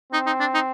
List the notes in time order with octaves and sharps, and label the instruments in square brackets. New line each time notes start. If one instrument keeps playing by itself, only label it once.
[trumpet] C4 [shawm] D#4
[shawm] D#4
D4
D#4